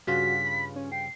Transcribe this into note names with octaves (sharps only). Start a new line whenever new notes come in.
G2 C#3 F4 F#4 B6
B5
C#4
G5 C7